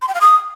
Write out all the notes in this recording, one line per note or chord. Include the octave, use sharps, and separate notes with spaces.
C6
G5
F5
D#6